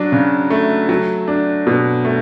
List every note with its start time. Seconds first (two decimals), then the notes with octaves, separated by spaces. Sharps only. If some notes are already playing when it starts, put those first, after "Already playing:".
Already playing: F#3 D4
0.12 C#3
0.50 A3
0.89 F#3
1.28 D4
1.67 B2
2.05 A3